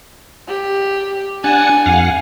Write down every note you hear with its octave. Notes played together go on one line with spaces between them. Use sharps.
G4
D4 F#5 G#5 A5
F2 F5 F#5